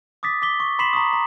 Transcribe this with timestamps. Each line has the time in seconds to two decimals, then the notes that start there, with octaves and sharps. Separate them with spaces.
0.23 D6 D#6 A6 B6
0.42 D6 B6 G7
0.60 C#6
0.79 B5 C6 B6 C7 E7 F#7
0.93 A#5 C#6 D#6
1.13 A#5